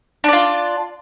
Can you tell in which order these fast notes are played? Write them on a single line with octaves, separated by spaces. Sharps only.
D4 D5 F4